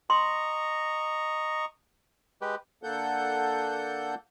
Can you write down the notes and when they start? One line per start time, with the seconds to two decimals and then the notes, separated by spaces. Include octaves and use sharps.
0.10 D#5 A#5 C6 C#6
2.41 G#3 G4 B4
2.83 D3 A#3 A4 F#5 G6